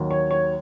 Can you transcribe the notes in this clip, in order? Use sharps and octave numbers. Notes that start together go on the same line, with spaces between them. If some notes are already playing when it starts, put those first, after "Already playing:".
Already playing: D#2 D#3 F#3
C#5
C#5